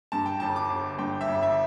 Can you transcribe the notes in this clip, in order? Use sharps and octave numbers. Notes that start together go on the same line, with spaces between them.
G2 A5
G5
G1 A5
D6
G1
G2 G5
E5
G1
E5